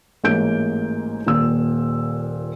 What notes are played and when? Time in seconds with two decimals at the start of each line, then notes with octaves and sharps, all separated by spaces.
0.24 A1 G#2 A#3 G6 D7
1.26 D#1 A#2 E6